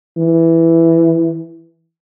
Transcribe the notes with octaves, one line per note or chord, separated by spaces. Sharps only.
E3